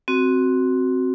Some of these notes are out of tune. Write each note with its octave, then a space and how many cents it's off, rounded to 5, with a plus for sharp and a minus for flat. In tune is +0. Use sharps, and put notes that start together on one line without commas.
C4 +0 F#4 +0